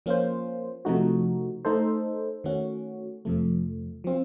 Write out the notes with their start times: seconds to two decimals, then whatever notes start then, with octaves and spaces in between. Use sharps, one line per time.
0.06 F3 A#3 C#4 F4 C5
0.85 C3 F3 A3 D#4 F#4
1.65 A3 D#4 A4 C5
2.44 D#3 A3 C#4 F#4
3.25 F2 C3 F3 A3
4.04 F3 C4 F4